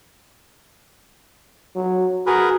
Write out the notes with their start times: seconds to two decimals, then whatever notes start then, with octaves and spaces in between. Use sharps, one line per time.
1.76 F#3
2.26 F#4 G#4 A#4 B4